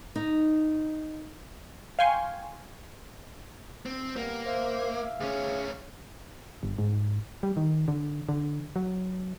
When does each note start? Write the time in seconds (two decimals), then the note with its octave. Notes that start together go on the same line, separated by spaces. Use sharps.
0.16 D#4
1.99 F5 G5 G#5 C6 C#6
3.86 C4
4.16 G3 A#3 B3
4.46 C5 E5 F5
5.20 D2 C#4 G#4
6.63 G1
6.78 G#2
7.43 G3
7.57 D#3
7.88 D3
8.29 D3
8.76 F#3